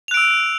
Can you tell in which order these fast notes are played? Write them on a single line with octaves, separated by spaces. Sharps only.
F7 F#6 D7 E6